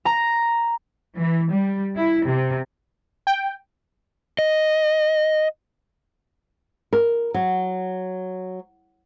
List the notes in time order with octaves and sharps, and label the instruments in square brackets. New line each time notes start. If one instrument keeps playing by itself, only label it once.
[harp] A#5
[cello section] E3
G3
E4
C3
[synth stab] G5
[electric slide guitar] D#5
[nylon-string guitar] A#4
F#3